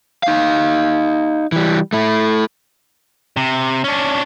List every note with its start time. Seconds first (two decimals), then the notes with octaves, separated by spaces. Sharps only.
0.23 D#4 F5
1.52 E3 G3
1.93 A3 E4
3.37 C3
3.84 C#4 D4